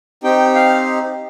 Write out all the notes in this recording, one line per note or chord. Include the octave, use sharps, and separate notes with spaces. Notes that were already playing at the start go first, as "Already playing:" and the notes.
C4 D#4 G4 G5
F5